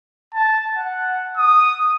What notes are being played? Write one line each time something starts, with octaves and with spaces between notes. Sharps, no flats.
A5
F#5
D#6